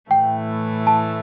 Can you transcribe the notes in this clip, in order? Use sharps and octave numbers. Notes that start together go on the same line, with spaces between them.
A2 E3 A3 G5
A5